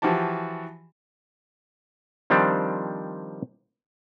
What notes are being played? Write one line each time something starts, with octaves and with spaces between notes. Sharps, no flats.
E3 F3 F#4 G4 A5
D#3 F3 G3 C4 D4